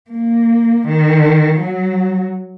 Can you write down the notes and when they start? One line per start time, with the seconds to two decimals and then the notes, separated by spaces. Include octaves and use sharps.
0.10 A#3
0.88 D#3
1.60 F#3